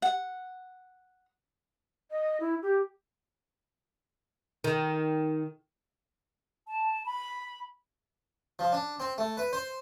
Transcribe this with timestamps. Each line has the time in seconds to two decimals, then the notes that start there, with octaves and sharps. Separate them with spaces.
0.02 F#5
2.11 D#5
2.40 E4
2.62 G4
4.64 D#3
6.67 A5
7.06 B5
8.59 F3
8.72 D4
9.00 C4
9.18 A3
9.37 B4
9.53 C5